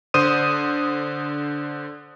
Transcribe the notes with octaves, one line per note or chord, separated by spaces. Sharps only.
D3 C5 D#6 D#7